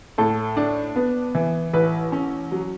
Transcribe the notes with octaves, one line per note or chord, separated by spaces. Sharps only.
A2 A4
D4
B3
E3
A1 B4
C#4
F#3